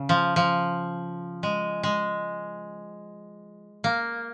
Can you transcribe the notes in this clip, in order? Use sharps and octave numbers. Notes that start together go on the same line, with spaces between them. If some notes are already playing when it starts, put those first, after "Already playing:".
Already playing: C#3
F3
F3
G#3
G#3
A#3